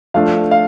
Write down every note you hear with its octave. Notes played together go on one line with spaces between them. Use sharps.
F3 A3 D4 F5
F5